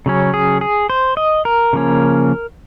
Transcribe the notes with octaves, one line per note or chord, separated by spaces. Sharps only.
C#3 F#3 C#4
G#4
G#4
C5
D#5
A#4
C#3 F3 A#3 C#4